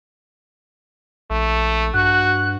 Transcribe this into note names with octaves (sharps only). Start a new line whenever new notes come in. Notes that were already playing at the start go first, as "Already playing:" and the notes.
A#1 A3
G2 F#4 F#6